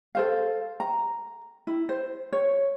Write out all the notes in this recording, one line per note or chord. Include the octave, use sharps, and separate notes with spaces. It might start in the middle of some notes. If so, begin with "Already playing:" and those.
A4 C5 F5
A#5
E4
C5
C#5